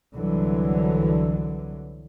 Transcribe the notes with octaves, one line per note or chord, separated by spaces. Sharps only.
C2 D3 E3 F#3